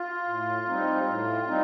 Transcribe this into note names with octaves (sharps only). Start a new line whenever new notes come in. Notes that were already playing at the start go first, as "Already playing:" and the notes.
Already playing: F4
A2
G3 C4 D#4
A2
G3 C4 D#4